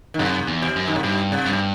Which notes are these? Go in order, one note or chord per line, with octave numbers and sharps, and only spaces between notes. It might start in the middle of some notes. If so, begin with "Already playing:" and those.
D#3
F#2 C3
E2
B2
F#2
D#3
C3
G2 B2
C3
G2
B2